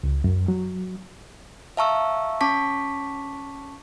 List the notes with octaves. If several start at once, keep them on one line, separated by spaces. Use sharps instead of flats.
C#2
F#2
F#3
E5 F5 A5 A#5 C#6 E6
C#4 A5 C#6 D6 B6